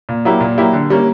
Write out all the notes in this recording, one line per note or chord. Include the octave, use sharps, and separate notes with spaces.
A#2
F#3 A#3 E4 G4
A#2
F#3 A#3 E4 G4
D3
G3 A#3 C#4